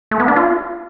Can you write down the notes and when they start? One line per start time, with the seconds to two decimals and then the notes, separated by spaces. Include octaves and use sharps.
0.11 A3
0.20 B3
0.28 D4
0.36 F4